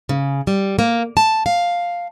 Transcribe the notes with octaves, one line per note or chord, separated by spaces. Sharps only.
C#3
G3
A#3
A5
F5